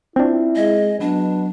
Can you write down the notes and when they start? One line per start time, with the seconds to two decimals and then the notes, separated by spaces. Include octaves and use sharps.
0.16 C4 D4 E4 F4
0.56 G#3 G#4 D#5
1.00 B2 F#3 B3 D4